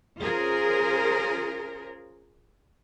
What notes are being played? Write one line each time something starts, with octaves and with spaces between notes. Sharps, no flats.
C#4 F4 G#4 A#4 C5